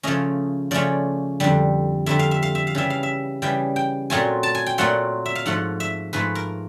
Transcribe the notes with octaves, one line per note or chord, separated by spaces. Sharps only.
C#3 F3 A3 C#4 D#5
C#3 F3 A3 C#4 D5
F2 D3 G3
F2 D3 G3 E5
F5
E5
F5
E5
F5
C#3 E3 G3 E5
F5
E5
C#3 E3 G3 G5
G5
A#2 F#3 A3 C4 F4 G#5
A5
G#5
G5
A#2 F#3 A3 C4 F4 F#5
E5
F5
G#2 F3 A3 F#5
E5
G#2 F3 A3 B4
A#4